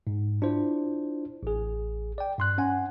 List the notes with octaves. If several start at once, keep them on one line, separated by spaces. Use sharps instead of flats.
G#2
D4 E4 F4 C5
A1 G#4
D5 G5
G2 C6 F#6
C#4 F#5 G#5